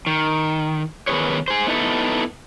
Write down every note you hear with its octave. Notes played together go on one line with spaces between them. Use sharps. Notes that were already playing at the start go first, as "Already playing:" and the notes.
D#3
D#3 B3 D#4 G#4 B4 C#5
G#4 C5
B3 D#4 E4 A4